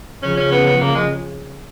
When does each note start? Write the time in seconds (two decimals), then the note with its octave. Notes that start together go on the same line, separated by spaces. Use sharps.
0.23 C#3 F3 C#4
0.37 C#4
0.52 B3
0.66 B3
0.81 A#3
0.95 G#3